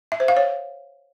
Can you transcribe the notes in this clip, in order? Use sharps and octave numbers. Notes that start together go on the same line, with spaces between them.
E5
C5
F5
C#5